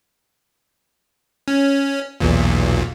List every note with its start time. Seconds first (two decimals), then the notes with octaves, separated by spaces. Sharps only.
1.48 C#4
2.20 B1 E2 A#2